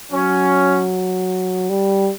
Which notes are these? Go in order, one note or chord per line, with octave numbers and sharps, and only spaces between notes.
F#3 C#4
G3